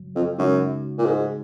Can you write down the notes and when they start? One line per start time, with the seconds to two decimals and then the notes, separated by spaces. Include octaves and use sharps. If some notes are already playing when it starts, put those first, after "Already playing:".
Already playing: F#2 C#3 F#3
0.16 F2
0.38 F#2 C#3 G#3 D#4 F#4
0.98 A#2
1.05 G#2